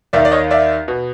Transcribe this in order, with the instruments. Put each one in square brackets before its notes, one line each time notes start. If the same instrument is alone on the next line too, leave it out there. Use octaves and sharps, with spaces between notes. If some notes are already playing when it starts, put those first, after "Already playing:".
[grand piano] D#2 D#3 D5 E5
D5
C#5 D#5
D5 E5
B2